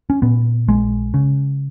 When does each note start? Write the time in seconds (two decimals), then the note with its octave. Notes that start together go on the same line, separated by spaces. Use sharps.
0.10 C#4
0.22 A#2 B3
0.68 A#1 G#3
1.14 C#3